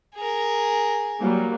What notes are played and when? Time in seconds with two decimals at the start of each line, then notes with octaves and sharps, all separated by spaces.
0.15 G#4 A#4
1.20 F#3 G3 A#3